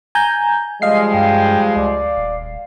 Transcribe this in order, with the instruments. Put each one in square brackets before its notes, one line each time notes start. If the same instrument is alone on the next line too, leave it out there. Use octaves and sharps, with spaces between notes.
[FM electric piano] G#5 A#5 G6
[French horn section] F3 G3 G#3 [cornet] D#5 [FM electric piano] F5 C7
[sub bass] G2 [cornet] G5
[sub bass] C#2 [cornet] D5
[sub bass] D#1